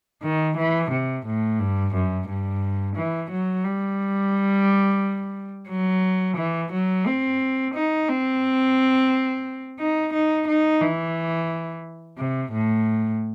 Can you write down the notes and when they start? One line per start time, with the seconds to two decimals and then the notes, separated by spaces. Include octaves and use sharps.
0.23 D#3
0.57 E3
0.92 C3
1.26 A2
1.59 G2
1.94 F#2
2.28 G2
2.96 E3
3.31 F#3
3.65 G3
5.69 F#3
6.37 E3
6.72 F#3
7.06 C4
7.74 D#4
8.08 C4
9.79 D#4
10.13 D#4
10.48 D#4
10.81 E3
12.18 C3
12.52 A2